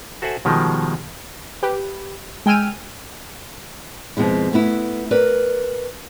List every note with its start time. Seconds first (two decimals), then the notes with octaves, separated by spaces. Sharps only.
0.22 F#4 A4 C5 E5 F#5 G#5
0.45 B2 D#3 F3 G3 G#3
1.63 G4 B4
2.46 G#3 G5 G#5 E6 F6 D#7
4.17 F2 B2 G#3 E4
4.53 A3 B3 E4
5.11 A#4 B4 D5